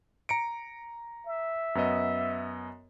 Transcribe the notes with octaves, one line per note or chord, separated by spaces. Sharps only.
A#5 C#7 D7
E5
F#2 B3 D#5